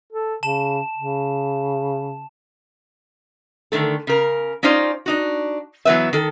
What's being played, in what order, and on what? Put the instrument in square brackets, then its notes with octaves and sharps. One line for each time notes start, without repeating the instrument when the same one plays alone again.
[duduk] A4
[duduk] C#3 [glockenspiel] A5 E7
[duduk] C#3
[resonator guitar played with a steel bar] D3 D#3 A3 A4
C#3 A#4
C#4 D#4 F4 C5 D5
D4 D#4 F#4
E3 F#3 B3 B4 E5
D#3 A4